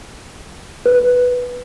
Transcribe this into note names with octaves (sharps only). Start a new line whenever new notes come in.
B4